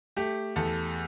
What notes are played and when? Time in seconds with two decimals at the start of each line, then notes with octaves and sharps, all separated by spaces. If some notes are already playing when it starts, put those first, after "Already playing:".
0.17 A3 G4
0.56 E2 A4